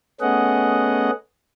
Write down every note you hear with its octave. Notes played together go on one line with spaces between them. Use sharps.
A3 B3 C#4 G#4 D#5 F#5